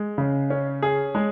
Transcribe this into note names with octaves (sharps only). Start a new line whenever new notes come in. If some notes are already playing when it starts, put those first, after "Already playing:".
Already playing: G#3
C#3
C#4
G#4
G#3